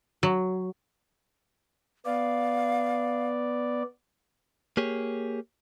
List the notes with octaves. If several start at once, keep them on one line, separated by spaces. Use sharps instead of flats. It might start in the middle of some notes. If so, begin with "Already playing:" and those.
F#3
B3 D5 F5
A#3 G4 G#4 C#5